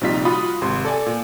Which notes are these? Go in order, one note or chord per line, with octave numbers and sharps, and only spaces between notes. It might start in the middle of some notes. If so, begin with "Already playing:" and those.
A#1 C3 G3 D#4 F4 B6
F4 F#4 B5 D#6
G#1 C3 C6
A4 D5 G#5
A#2